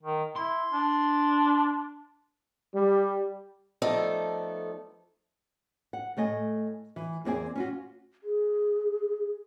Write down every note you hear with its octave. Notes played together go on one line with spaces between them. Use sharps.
D#3
E4 C6
D4
G3
F3 A3 B3 D#4 A4 D5
F#5
A2 A3 D#5 G#5
E3
E2 A#3 C4 G#4 D5 G#5
C#4 F4 F#4
G#4